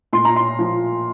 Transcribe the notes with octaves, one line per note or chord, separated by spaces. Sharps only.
A#2 C6
A#5
C6
F3